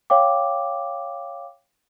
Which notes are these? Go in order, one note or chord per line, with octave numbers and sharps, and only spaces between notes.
C#5 F5 G5 D6